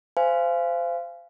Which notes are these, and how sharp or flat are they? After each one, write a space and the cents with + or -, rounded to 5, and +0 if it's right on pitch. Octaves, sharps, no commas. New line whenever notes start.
C5 -20 F5 -25 G#5 +0